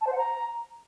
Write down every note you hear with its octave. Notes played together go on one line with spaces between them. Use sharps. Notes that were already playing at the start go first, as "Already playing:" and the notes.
A5
C5
F#5
A#5